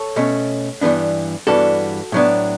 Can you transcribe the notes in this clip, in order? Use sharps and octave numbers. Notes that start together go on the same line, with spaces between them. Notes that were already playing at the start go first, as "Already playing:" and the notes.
Already playing: A4 C#5
B2 A3 C#4
G2 E3 G3 B3 D4
G2 E3 G3 B3 D4 F#4 A4
A2 F#3 B3 D4